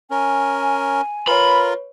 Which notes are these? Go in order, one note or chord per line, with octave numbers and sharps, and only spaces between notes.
C#4 A#4 G#5
F4 A#4 B4 C#5 B5